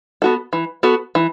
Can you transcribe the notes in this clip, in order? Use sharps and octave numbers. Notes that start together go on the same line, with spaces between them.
B3 F#4 A4
E3
B3 F#4 A4
E3